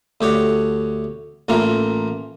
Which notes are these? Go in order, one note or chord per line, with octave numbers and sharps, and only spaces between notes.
D2 G4 C#5 F#5
A1 E3 A#3 F4 A#5